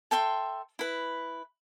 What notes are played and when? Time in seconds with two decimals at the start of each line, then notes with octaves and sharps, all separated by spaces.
0.11 A4 E5 G5 C6
0.79 E4 B4